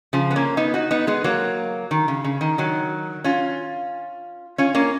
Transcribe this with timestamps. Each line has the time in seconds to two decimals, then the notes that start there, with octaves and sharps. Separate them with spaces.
0.13 C#3 F3
0.31 B3
0.36 A#3 C#4
0.57 B3 D#4
0.74 D#4 F#4
0.91 B3 D#4
1.07 G#3 B3
1.24 F#3 A#3
1.91 D#3
2.08 C#3
2.24 C#3
2.41 D#3
2.58 D#3 F#3
3.24 C#4 F4
4.58 C#4 F4
4.75 A#3 C#4